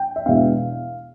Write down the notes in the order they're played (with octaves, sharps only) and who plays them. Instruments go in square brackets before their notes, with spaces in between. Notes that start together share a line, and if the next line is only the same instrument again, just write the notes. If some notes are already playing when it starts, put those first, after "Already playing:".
Already playing: [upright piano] G5
E5
E2 B2 G#3 B3 D4 F5